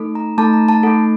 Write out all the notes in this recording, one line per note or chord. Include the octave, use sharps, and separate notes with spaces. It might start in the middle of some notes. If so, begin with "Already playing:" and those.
Already playing: A3 D#4 A4
A#5
A3 D#4 A4 A5
A#5
A5
A3 D#4 A4 F#5